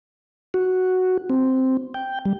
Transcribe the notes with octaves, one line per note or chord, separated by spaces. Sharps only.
F#4
C4
G5
G3